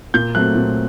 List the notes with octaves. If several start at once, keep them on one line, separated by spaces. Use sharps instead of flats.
A#2 G6
F#3 A3 C4 F#6
A#2